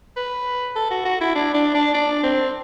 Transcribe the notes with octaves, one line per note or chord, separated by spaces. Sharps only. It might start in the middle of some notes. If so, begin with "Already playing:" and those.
B4
A4
F#4
F#4
E4
D4
D4
D4
D4
C4